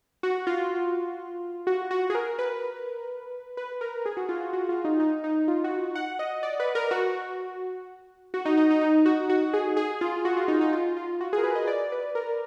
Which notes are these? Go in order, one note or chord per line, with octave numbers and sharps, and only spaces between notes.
F#4
F4
F#4
F#4
G#4
A#4
B4
B4
A#4
G#4
F#4
F4
F#4
F#4
F4
D#4
D#4
D#4
F4
F#4
F#5
D#5
D5
B4
A#4
F#4
F#4
D#4
D#4
D#4
D#4
F#4
F#4
G#4
G#4
F4
F#4
F4
D#4
D#4
F4
F4
F#4
G#4
A#4
B4
D#5
D5
B4
A#4